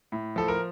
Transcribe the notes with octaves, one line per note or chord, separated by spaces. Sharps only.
A2
F3 A4
A#4